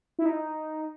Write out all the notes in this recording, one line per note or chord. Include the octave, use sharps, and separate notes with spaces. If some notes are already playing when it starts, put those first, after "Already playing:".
E4
D#4